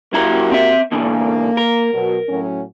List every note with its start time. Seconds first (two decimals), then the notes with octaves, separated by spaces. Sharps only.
0.13 F#2 A#3 E4 F#4 G4 A#5
0.52 C4 E5
0.92 B2 D3 E3 A#3
1.57 A#4
1.93 B2 F#3
2.28 A2 F#3 C#4